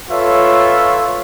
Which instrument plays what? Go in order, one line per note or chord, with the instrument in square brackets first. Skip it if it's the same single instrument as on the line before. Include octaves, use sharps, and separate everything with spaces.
[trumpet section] F4 A4 B4 C#5 E5